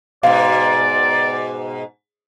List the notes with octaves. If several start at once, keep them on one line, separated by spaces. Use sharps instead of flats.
G#2 B2 D5 F5